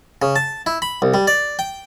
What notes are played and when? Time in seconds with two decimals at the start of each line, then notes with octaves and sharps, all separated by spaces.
0.22 C#3
0.36 A5
0.66 E4
0.82 B5
1.02 C2
1.14 G3
1.27 D5
1.59 G5